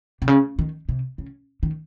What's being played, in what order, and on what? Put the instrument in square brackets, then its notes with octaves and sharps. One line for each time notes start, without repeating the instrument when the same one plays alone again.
[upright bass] C3
C#3
D#3
C3
C#3
D#3